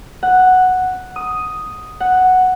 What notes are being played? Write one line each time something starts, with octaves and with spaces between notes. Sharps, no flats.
F#5
D#6
F#5